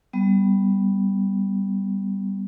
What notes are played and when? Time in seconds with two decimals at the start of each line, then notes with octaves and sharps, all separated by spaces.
0.13 G3 B3